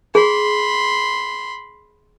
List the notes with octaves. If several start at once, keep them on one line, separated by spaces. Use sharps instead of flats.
G#4 B5 C6